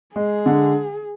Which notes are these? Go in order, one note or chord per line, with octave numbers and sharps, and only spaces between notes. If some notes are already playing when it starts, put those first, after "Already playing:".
G#3 G#4
D3